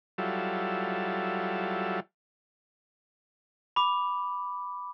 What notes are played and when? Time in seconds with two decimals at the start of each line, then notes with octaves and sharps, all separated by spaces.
0.18 F#3 G3 E4 F4 A4
3.76 B5 D6